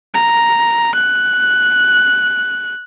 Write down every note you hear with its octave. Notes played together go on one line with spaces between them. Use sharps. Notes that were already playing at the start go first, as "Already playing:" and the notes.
A#5
F#6